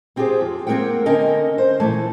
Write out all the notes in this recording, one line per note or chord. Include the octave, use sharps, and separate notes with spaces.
B3 C4 F4 G4 G#4 C5
F2
A#3 C4 C#4 A#4 F#5 G5
D3 C4 C#4 A#4 D#5
C5
A#2 E3 F3 A3 A5